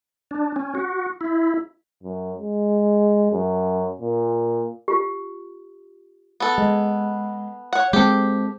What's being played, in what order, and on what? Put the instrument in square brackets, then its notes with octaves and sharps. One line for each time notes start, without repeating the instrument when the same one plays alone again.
[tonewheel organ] D4
C#4
F#4
E4
[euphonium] F#2
G#3
F#2
A#2
[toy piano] F4 G4
[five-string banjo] B3 A4
[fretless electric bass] G#3
[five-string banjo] C#5 F#5
[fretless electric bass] G#3 C4 [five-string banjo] G4 A4